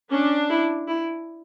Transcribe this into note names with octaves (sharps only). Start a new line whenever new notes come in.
C#4 D4
E4
E4